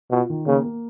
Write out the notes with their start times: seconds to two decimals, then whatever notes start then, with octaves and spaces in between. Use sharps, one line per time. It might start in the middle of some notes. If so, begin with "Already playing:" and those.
0.11 B2 F4
0.30 D#3
0.47 C#3 A#3
0.64 A#3